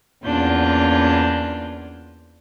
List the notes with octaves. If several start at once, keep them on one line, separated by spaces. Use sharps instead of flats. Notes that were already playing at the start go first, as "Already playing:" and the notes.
E2 A#2 C#4 D4 F4 G6